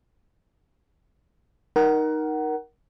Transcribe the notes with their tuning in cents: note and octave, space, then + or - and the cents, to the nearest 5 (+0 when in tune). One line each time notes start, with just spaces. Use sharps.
D#4 +0 A#4 +15 F#5 +25